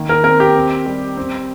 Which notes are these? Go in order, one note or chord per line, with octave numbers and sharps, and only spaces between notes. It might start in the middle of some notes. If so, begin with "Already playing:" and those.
Already playing: D#3 A#3
A#4
C4 A#4
G4
C4
G3
C4